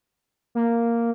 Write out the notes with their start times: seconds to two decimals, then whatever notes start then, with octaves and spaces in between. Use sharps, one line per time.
0.55 A#3